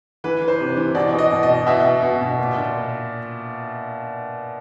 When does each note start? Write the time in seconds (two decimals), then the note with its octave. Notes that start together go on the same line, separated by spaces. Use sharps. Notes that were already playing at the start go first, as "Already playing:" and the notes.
0.24 E3 B4
0.42 E3
0.48 C5
0.60 C3
0.77 E3
0.95 B2 D5
1.13 B2
1.19 D#5
1.31 B2
1.43 D#5
1.50 B2
1.67 B2 E5
1.85 B2
2.02 B2
2.21 B2
2.39 A#2
2.56 A#2